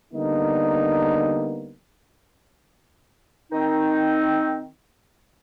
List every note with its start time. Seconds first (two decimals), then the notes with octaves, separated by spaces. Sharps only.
0.13 D3 G3 A#3 B3 D#4
3.52 D#3 C4 D#4